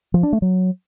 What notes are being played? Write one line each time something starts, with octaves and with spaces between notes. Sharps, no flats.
F3
D4
A3
F#3